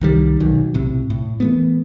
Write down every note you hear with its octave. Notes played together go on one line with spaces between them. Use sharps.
C2 D#3 G3
B1 D#3 F#3
B1 A2 C3
A2
E3 A3 B3